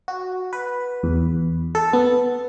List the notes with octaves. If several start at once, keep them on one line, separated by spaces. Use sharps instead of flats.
F#4
B4
E2
A4
B3